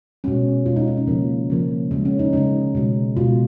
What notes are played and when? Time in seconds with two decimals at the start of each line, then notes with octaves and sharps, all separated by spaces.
0.24 B2 G#3 C#4
0.66 B2 G#3 F4
0.76 D#4
0.87 D#4
0.97 C#4
1.07 C#3 F3 A#3
1.50 C#3 F3 A#3
1.91 C#3 G#3
2.05 C#4
2.19 D#4
2.33 C#3 G#3 D#4
2.75 B2 G#3
3.17 B2 G#3 F4